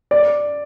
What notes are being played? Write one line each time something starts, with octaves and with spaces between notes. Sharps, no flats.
D5